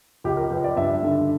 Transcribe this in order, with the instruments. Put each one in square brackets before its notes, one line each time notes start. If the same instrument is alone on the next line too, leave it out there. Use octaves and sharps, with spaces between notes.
[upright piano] C#2 G4
A#4
C#2 B4
D5
G2 E5
D3